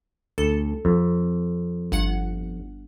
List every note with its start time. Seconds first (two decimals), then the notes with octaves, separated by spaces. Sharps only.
0.38 D2 A4
0.85 F2
1.92 G1 F#5 C#7